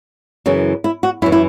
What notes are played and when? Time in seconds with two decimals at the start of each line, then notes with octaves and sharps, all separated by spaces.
0.46 F#2 C#3 E3
0.84 E4
1.03 F#4
1.22 F#2 E4
1.26 E3
1.32 E4